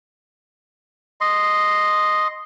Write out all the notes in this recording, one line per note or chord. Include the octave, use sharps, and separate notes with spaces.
D#5 C6